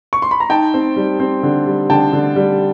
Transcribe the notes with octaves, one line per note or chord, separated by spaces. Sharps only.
C#6
C6
B5
A#5
D#4 G5 A5
C4
G3
C4
D3
G3
D3 G5 A5
D3
G3